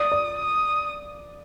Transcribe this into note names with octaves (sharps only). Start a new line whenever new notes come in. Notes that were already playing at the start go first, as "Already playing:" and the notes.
Already playing: D5 D#6
D5
D#6